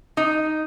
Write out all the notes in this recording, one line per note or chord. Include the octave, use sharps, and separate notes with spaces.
D#4